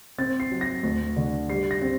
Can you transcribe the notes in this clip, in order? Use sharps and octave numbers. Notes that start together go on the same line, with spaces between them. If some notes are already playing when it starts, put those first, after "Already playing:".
C4 A6
C7
F#3
A#6
D2
D3
G3 C7
A#6
C4